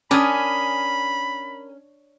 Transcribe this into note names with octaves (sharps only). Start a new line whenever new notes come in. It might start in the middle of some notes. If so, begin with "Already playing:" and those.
C#4 D4 A#4 G#5 B5 D#6